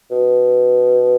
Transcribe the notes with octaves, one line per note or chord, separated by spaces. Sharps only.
B2